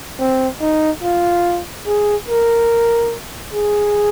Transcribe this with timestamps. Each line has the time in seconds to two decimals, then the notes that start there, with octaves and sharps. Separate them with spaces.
0.19 C4
0.61 D#4
1.03 F4
1.87 G#4
2.28 A#4
3.54 G#4